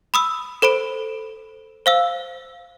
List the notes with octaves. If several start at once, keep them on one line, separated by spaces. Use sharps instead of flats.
B5 D#6 E6
A4 C5 B5 D7
C5 F5 E6